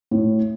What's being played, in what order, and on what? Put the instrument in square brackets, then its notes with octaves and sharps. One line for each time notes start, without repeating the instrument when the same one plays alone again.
[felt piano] A2